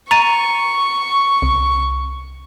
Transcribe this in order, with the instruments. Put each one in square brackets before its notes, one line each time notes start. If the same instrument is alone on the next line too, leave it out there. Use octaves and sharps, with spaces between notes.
[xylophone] A#5 A6 D#7 [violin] C#6
[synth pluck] C2